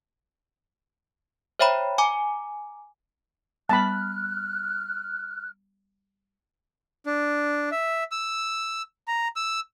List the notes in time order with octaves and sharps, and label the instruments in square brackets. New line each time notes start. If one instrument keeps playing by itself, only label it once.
[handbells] C5 C#5 E5 G5 A#5 B5
G#5 A#5 D6
[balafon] G3 B3 G5 [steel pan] A5 B5 [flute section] F6 F#6
[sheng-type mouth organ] D4
E5
E6
A#5
E6